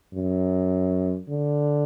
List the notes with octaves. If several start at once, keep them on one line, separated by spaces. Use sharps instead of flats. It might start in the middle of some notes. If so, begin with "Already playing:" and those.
F#2
D3